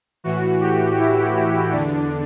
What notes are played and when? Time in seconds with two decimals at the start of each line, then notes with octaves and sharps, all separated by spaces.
0.24 A2 E3 F#4
0.61 G4
0.98 E4
1.72 E2 D3 D4